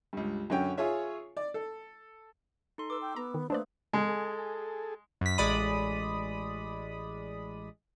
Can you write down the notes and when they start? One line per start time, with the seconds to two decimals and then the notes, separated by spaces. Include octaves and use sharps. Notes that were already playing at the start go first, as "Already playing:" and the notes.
0.13 C#2 G2
0.50 F#2 D3 C#4 G5
0.77 F4 G#4 C#5 E5
1.37 D5
1.54 A4
2.78 D#4 A4 C6
2.90 B4 D6 E6
3.01 G5
3.16 B3 A#5
3.34 D#3
3.50 A3 A#3 D4 B4 C5 D5
3.93 G#3 G#4 A4
5.21 F#2 B6
5.38 A1 G#3 D5 B5 D#6